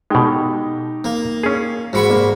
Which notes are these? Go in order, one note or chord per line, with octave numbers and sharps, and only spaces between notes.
B2 G#3 D#4 G4 A4
A#3
C#4 G#4
G#2 F#4 B5 C#6 C#7
G3 A#3 D4